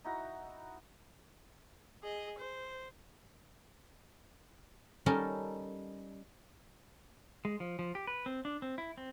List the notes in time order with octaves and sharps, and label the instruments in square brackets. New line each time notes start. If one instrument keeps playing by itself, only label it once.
[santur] D#4 E4 F#4 A#5
[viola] G#4 D#5
C5
[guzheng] G3 C#4 D#4 A4 A#4
[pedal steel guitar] G#3
F3
F3
G4
B4
C4
D4
C4
E4
C4